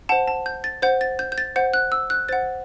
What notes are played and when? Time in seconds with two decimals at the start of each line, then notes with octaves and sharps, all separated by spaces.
0.09 C5 F#5 A5
0.28 A5
0.46 G6
0.64 A6
0.82 C5 F#5 G6
1.01 A6
1.19 G6
1.32 G6
1.38 A6
1.56 C5 F#5 G6
1.74 F#6
1.92 E6
2.10 F#6
2.29 C5 F#5 A6